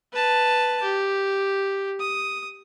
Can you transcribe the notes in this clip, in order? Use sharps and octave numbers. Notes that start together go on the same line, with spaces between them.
B4 A5
G4
D#6